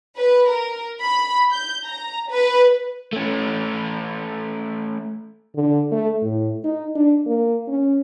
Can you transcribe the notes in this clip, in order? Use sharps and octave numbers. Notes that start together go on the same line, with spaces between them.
B4
A#4
B5
G6
A#5
B4
A3 C#4
D3
A3
A2
D#4
D4
A#3
C#4